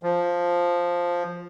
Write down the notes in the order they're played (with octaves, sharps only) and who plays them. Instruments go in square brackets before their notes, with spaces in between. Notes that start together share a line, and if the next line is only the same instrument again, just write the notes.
[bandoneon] F3